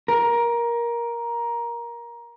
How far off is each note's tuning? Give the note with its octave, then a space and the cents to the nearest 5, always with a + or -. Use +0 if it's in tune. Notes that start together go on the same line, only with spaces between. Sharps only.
A#4 +15